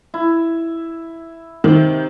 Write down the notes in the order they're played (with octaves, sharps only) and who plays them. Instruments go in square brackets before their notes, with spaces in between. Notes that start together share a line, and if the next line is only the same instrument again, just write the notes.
[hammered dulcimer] E4
[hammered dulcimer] C3 [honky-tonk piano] D#3